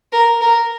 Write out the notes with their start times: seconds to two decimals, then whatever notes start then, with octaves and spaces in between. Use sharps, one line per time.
0.12 A#4
0.41 A#4